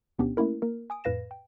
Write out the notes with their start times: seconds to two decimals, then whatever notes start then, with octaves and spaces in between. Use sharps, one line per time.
0.18 D2 B2 B3 C#4 D4 G4
0.37 A3 A#3 C#4 E4 A#4
0.62 A#3 A#4
0.90 G#5 D#6 D7
1.04 F2 A2 B4 F5 A#6 E7
1.31 G5